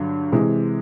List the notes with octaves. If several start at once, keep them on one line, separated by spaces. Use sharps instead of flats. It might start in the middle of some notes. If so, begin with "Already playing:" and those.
Already playing: G2 D3 F#3
C3 E3 G#3